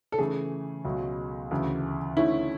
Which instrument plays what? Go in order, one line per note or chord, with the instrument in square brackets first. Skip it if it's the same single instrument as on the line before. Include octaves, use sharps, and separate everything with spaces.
[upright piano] A4
[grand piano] C#3 E3 A3 [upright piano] G#4
[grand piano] C#2 B2 F#3 A3
D2 C#3 E3
[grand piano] D3 A3 C#4 [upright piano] E4